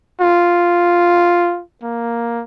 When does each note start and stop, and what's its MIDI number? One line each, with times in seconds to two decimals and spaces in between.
0.21 1.62 65
1.83 2.44 58